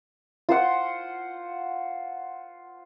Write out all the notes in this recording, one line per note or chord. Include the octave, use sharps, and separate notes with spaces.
F4 C5 F#5 C6